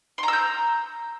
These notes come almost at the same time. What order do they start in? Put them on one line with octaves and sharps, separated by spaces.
C6 A#5 E6 G6